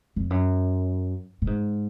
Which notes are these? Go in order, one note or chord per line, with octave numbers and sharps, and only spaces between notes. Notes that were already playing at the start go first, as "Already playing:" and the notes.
F2
F#2
A2
G#2